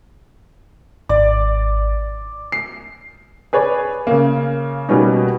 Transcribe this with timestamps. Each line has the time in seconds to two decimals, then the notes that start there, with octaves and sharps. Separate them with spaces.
1.09 G#1 D5
2.52 C7
3.53 G#4 B4 C#5 D5
4.07 C#3 A#3
4.89 B2 G3 A#3 B3 C#4 D#4